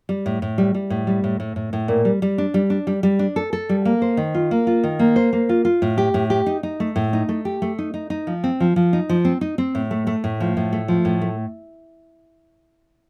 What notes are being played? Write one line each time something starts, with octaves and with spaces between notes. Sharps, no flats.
G3
A2
A2
G3
G3
A2
G3
A2
A2
A2
A2
A#2
G3
G3
D4
G3
D4
G3
G3
D4
A4
A4
G3
A#3
C5
D#3
F4
A#3
F4
D#3
A#3
C5
A#3
F4
F4
A2
G4
A2
G4
D#4
D#4
A3
A2
D#4
A3
G4
A3
D#4
D#4
D#4
F3
C4
F3
F3
D#4
F3
C4
D#4
C4
A2
A3
A3
A2
F3
A2
A3
F3
A2
A3